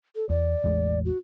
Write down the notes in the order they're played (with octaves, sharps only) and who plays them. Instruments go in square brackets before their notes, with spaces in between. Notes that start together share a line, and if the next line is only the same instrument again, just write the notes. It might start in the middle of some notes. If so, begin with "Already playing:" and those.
[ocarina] A4
[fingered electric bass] E2 [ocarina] D5
[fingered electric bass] A1 E2 G#3
[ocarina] F#4